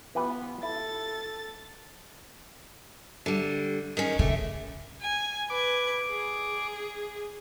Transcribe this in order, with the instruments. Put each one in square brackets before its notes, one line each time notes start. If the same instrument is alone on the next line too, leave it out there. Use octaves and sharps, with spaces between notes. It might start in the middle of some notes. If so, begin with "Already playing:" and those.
[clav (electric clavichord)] E3 G4 B4 [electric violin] B3 F4
[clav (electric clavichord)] E4 [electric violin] A4 A6
[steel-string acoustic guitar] D3 G3
D#3 G#3 C#4
[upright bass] C#3 [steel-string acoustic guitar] A3 G4
[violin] G#5
[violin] B4 G#6 [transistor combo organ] D6
[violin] G#4